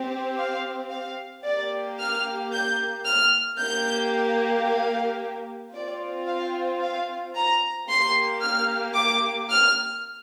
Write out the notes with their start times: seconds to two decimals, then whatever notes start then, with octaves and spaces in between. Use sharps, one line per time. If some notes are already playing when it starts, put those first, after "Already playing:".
Already playing: C4 G4
0.38 F5
0.91 F5
1.44 A#3 G4 D5
1.98 F6
2.52 G6
3.06 F6
3.59 A#3 G4 G6
4.66 F5
5.73 C4 F4 D5
6.27 F5
6.81 F5
7.35 A#5
7.88 A#3 G4 C6
8.41 F6
8.94 D6
9.49 F6